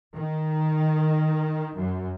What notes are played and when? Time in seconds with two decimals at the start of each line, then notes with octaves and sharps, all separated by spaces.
0.15 D#3
1.77 F#2